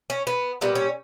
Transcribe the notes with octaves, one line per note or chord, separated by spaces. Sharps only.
C#4
B3
A#2 G3 B3
C#4